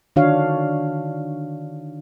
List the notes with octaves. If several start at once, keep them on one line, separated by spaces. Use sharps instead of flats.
D3 D#3 D4 F#4 C#5 F5